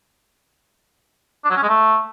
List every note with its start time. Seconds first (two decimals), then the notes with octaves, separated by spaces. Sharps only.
1.44 D4
1.50 F#3
1.57 C#4
1.63 G#3
1.69 A3